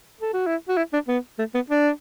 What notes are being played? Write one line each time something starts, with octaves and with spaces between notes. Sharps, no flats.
A4
F#4
E4
F#4
E4
D4
B3
A3
B3
D4